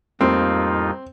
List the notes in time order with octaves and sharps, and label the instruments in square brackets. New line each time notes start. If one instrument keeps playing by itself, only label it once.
[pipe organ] F2 D#4 F4 [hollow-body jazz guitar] A2 G3 A#3 [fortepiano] C4